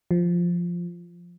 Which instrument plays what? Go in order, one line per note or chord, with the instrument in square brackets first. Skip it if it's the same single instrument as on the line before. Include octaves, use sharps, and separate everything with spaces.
[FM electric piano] F3